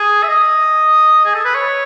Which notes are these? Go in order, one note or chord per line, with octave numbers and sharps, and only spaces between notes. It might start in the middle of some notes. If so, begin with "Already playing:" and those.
Already playing: G#4
E5
D#5
G#4
A4
B4
C#5